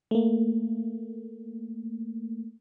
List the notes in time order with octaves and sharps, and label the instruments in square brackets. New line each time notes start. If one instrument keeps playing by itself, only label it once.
[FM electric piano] A3 A#3